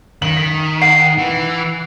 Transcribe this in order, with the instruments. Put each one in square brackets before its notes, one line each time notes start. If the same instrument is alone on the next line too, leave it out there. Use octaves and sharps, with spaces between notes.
[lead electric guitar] D#3 [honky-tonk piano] F#7
[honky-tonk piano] B6
[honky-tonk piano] F#5 [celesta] C7
[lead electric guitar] E3